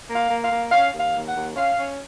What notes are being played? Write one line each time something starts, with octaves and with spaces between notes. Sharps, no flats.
A#3
F5
A#3
F5
A#3
C#4 F5
D#2
F5
D#2
F#5
D#2
C#4 F5
C#4